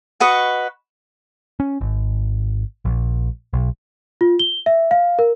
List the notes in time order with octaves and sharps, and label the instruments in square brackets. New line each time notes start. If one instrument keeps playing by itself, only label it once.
[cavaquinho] F#4 B4 D#5 C#6
[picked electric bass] C#4
G#1
A#1
B1
[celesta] F4
G7
E5
F5
A#4